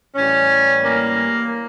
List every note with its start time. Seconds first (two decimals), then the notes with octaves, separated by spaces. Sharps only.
0.15 A2 E3 G3 C#4
0.83 A#3